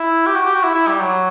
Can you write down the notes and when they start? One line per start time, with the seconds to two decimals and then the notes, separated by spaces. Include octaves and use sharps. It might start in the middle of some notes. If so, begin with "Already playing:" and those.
Already playing: E4
0.26 G4
0.35 F#4
0.46 G4
0.55 F#4
0.63 E4
0.75 E4
0.87 G3
1.00 F#3